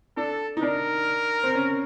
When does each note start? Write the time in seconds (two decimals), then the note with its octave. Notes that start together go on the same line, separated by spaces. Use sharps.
0.17 D4 A4
0.57 D#4
0.62 D4 A#4
1.43 C4
1.55 C#4